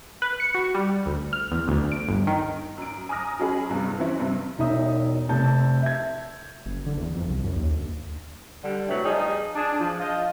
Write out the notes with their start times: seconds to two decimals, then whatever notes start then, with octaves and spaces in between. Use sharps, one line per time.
0.22 B4
0.40 C#7
0.55 F#4
0.74 G3
1.06 D2
1.33 F6
1.51 E2
1.68 D2
1.92 D7
2.08 G1
2.27 D#3
2.78 F#2 D7
3.09 G#5 A#5 D6 D#6 F6 A#6
3.39 F#3 C#4 G#4 B5
3.69 E2 G2 C3
3.99 E3 C4 C#4 E4
4.19 G2 C3
4.58 E1 B1 D#4 E5 D#6
5.29 F1 C3 A5 G6
5.82 E5 G#6
6.66 F#1
6.86 D3
6.97 E2
7.15 F2
7.28 C2
7.43 F#2
7.56 D#2
7.71 D2
8.63 D3 G3
8.89 A2 C3 F#3 A3 B4
9.04 F3 G3 D#4 G#4
9.56 D4 G#4
9.80 F3
10.00 F3 F4 D#5